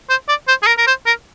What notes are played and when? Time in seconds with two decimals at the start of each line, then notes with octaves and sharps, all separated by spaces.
0.10 C5
0.29 D5
0.48 C5
0.63 G#4
0.67 A#4
0.78 A#4
0.87 C5
1.06 A#4